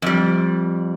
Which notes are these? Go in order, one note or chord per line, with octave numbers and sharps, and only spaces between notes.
F2 G3